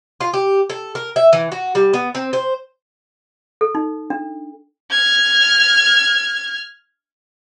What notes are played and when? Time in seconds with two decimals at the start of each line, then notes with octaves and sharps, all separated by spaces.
0.20 F4
0.34 G4
0.70 A4
0.95 A#4
1.16 E5
1.33 E3
1.52 F#4
1.75 G3
1.93 B3
2.15 C4
2.33 C5
3.61 A4
3.75 D#4
4.10 D4
4.91 F6 G#6